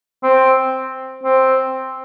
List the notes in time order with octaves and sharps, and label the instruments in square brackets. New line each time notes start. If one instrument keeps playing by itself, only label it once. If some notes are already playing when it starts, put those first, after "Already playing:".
[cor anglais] C4
C4